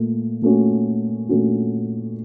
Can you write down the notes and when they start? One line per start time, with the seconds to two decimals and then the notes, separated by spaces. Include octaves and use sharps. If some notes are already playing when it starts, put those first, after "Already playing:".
Already playing: A#2 A3
0.42 A#2 A3 C#4 F#4
1.29 A#2 A3 C#4 F#4